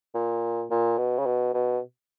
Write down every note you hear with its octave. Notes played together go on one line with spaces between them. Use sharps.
A#2
A#2
B2
C#3
B2
B2